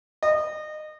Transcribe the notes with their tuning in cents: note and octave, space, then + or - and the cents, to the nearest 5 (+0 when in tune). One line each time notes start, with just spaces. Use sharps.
D#5 -25